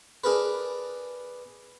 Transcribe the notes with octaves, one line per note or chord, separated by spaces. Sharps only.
D4 G#4 A#4 B4